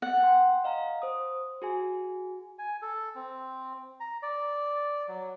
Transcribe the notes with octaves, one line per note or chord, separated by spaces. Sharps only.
B3 F#5
G5 C6
D#5 F5 A#5
C5 D#6
F#4 G#4 G#5
G#5
A4
C4
A#5
D5
F#3